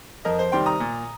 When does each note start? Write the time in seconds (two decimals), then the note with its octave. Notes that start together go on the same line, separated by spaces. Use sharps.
0.25 F2 A#4 D#5
0.39 C5
0.52 C3 D#3 G3 G5 C6
0.66 A#5 D#6
0.80 A#2